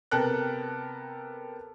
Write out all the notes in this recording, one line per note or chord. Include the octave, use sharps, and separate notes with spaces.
C3 B3 A4 A#4 G5 F#6